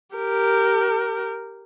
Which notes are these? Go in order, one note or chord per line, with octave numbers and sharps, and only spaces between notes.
G4 A#4